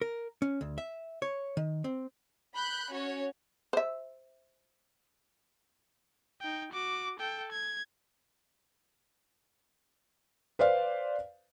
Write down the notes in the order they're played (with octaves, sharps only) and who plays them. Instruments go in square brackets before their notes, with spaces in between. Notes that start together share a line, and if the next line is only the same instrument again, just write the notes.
[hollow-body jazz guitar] A#4
C#4
D2
E5
C#5
D#3
C4
[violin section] B5 F#6 G6
C#4 F#4 C#5
[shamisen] C5 E5
[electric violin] D#4 G5
F#4 D6
A4 G5
G#6
[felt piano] B4 C5 D5 F5